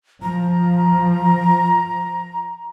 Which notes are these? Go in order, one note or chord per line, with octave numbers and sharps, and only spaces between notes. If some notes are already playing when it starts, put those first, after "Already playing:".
F3 A#5